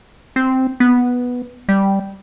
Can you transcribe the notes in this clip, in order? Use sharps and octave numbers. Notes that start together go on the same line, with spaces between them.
C4
B3
G3